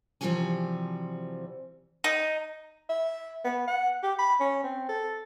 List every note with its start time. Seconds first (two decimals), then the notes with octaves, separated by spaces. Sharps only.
0.21 C3 E3 F3 G3 F#4 G#5
2.04 D#4
2.90 E5
3.45 B3
3.68 F#5
4.03 G4
4.19 B5
4.40 C#4
4.64 C4
4.89 A4